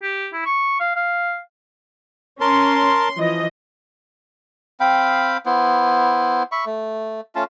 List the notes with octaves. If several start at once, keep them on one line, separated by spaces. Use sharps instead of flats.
G4
E4
C#6
F5
F5
C#4 A#4 A5 C6
E3 F3 D#5
C4 F5 G5 B5
B3 E4 C5
E5 B5 C#6
A3
A3 C#4 F4 A5